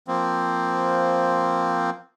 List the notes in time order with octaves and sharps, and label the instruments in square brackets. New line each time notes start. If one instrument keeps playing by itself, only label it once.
[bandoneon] F3 A#3 C4